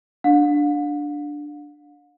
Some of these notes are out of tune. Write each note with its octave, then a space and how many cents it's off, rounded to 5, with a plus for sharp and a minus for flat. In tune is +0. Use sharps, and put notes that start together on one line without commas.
D4 +0 F5 +45